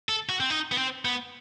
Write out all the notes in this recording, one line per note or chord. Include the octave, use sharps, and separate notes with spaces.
A4
F#4
C4
D#4
B3
C4
B3